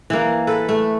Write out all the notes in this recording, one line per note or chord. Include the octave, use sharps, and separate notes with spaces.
E3 A#3
A4 B4
A3